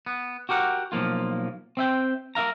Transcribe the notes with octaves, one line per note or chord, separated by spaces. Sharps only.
B3
F#4 G4 A#4 F#5
B1 F3 A#3 F4
C4 E5 G5
A#4 E5 F5 A#5